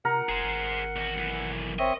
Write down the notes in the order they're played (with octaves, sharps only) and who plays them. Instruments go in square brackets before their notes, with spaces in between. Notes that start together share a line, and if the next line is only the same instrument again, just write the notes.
[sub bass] C3 [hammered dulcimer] A#4 [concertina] F#5
[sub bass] F1 [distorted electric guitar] G#4 C5
[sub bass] G#1
[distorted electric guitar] E2 F#4
B1 E3
[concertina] C4 C#5 E5 [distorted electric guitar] D#5